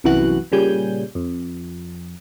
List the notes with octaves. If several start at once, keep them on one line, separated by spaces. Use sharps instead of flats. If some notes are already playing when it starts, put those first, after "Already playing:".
C2 F#2 E3 B3 F#4 F#6
A#2 C#3 G3 G#5 G6
F2